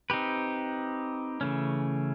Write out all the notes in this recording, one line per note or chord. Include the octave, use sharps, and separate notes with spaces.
C4 D#4 G4 B4
C#3 E3 A3 C#4